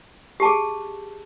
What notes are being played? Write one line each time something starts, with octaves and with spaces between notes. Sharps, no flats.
G4 G#4 A5